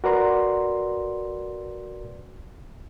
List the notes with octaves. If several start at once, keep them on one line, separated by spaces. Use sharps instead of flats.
F#4 A#4 B4 D5 A#5 C6